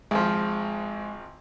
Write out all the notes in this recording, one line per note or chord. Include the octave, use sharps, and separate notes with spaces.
G#1 F3 G#3